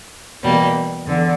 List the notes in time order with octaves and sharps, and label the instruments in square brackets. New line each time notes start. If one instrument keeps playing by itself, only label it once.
[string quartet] E2 B2 G3 A#3
E2 D3